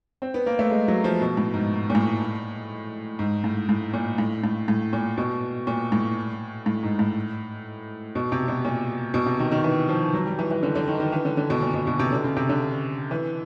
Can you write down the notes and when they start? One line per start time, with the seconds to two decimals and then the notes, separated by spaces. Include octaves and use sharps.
0.22 C4
0.34 B3
0.46 A#3
0.59 A3
0.71 G#3
0.88 F#3
1.04 F3
1.21 B2
1.37 A2
1.54 G#2
1.90 A#2
1.95 A2
3.19 G#2
3.44 A2
3.69 A2
3.93 A#2
4.18 A2
4.44 A2
4.68 A2
4.93 A#2
5.18 B2
5.67 A#2
5.92 A2
6.66 A2
6.83 G#2
6.99 A2
8.15 B2
8.32 C3
8.48 B2
8.65 A#2
9.14 B2
9.26 C3
9.39 D#3
9.51 D#3
9.64 E3
9.89 F3
10.14 F#3
10.26 G3
10.39 E3
10.51 E3
10.63 D3
10.75 D3
10.88 D#3
11.00 D#3
11.12 E3
11.25 D3
11.37 D3
11.50 B2
11.62 A#2
11.74 B2
11.87 B2
11.99 C3
12.12 D3
12.24 C#3
12.37 C3
12.49 D3
13.11 E3